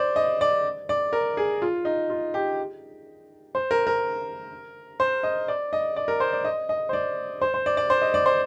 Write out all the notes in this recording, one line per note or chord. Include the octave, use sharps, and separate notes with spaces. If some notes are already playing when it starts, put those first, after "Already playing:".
Already playing: C5 D5
D#5
D5
D5
A#4
G#4
F4
D#4
F4
G4
C5
A#4
A#4
C5
D#5
D5
D#5
D5
A#4
C5
D5
D#5
D#5
C5
D5
C5
C5
D5
D5
C5
D#5
D5
C5